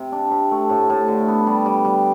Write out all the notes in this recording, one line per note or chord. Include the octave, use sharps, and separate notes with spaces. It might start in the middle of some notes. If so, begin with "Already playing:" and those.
Already playing: C3
D4
C3
A3
A2
A2
D3
B3
G3
G3
G3